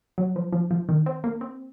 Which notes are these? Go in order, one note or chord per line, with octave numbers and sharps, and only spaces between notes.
F#3
F3
F3
F3
D#3
C4
A#3
C4